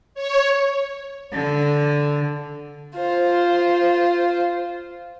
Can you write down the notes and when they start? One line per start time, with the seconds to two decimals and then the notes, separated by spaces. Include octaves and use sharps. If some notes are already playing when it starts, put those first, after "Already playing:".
0.14 C#5
1.33 D3
2.96 F4 C5